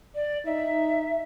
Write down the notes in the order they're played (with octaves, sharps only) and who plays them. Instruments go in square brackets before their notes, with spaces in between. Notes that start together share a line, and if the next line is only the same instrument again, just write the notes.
[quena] D5
[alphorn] D#4 [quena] E5